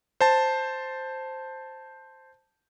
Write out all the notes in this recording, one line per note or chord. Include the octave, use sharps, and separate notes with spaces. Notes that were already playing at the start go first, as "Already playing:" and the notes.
C5 A5